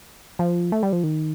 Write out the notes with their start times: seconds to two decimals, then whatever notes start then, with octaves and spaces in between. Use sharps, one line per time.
0.39 F3
0.72 A3
0.83 G3
0.93 F3
1.03 D#3